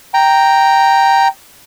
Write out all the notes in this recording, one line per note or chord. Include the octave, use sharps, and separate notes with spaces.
G5 A#5